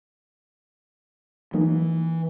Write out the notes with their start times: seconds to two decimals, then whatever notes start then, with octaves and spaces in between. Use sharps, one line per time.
1.54 E3 F#3 A#3 D#4